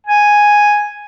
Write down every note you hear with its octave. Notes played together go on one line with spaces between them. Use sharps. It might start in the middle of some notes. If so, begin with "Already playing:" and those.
G#5